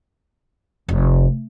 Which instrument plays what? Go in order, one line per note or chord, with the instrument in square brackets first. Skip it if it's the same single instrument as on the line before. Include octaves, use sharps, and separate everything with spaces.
[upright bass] F1